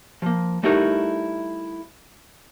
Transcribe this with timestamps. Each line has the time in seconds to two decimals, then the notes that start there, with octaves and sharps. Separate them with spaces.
0.22 F3 A#3
0.63 G3 A3 D#4 E4 F#4 A#4